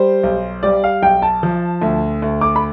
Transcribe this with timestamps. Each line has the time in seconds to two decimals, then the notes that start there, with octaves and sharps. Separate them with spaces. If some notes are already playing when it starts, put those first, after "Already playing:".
Already playing: G3 C5
0.23 B1
0.63 G3 D5
0.84 F5
1.02 B1 G5
1.22 A5
1.43 F3
1.82 D2
2.22 D2
2.41 D6
2.56 B5